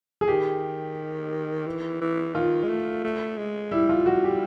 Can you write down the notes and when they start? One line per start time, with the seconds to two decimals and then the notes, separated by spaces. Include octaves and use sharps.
0.21 G#4
0.28 D#3 G4
1.66 E3
2.01 E3
2.34 D#3 F4
2.63 G#3
2.69 A3
3.04 A3
3.38 G#3
3.71 G3 E4
3.89 F4
4.06 F#4
4.24 G4